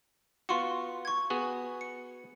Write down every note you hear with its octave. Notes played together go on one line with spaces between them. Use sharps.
B3 F4 F#4 C6 C#6 C#7
C#6 G#6
B3 F#4 G#4
C#7